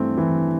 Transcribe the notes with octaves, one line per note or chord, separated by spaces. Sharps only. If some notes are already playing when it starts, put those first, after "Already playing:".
Already playing: G2 E3 A3 C4
E3